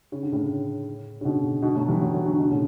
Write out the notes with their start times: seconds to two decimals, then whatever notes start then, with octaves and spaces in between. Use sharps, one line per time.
0.12 C#3
0.23 D3
0.32 A2 C#3
1.21 C#3
1.25 B2 D3
1.62 B2 D3
1.75 F#3 A3
1.88 E3 G3
2.00 F#3 A3
2.13 F#3 A3
2.25 D3 F#3
2.38 B2 D3
2.51 A2 C#3